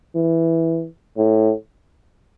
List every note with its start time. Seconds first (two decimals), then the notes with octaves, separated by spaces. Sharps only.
0.15 E3
1.17 A2